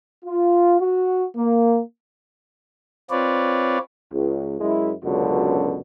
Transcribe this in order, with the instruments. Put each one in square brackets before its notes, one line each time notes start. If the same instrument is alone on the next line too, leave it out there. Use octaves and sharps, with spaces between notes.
[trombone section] F4
F#4
A#3
[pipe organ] C4 F4 B4 C#5 D5
[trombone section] C#2
F#2 G#3 E4
C#2 F#2 B2 D3